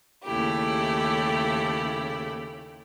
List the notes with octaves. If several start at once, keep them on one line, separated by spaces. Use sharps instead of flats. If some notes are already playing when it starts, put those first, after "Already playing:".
D#2 C#3 A3 E4 G4